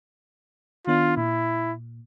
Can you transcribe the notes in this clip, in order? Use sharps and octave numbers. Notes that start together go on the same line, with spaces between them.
D#3 B3 D4 F4
A#2 E4